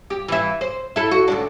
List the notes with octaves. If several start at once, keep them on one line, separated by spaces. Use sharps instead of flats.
G4
E3 E4
C5
E4 A4
F#4
D2 G#2 D4